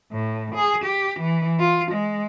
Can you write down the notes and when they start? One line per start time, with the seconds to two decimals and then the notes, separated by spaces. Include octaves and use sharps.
0.12 A2
0.55 G#4
0.85 G4
1.20 E3
1.60 F4
1.91 G#3